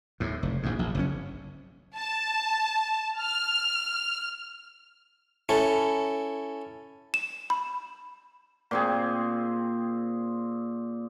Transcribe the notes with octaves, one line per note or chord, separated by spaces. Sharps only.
D#2 A2
F1
A#1 D#2 G#2
A#1
F#1 G2 C#4
A5
F6
C#4 E4 A4
E7
B5
A#2 C4 G#4